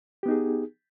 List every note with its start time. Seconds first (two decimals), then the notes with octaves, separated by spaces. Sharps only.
0.23 G4
0.26 B3
0.28 D#4
0.31 G#4